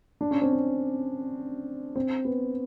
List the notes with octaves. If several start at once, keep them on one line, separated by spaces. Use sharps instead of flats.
D4
C#4
C4
C#4
C4
B3